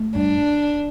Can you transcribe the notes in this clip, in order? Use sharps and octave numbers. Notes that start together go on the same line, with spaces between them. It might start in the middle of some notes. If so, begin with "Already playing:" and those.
Already playing: A3
G2 D4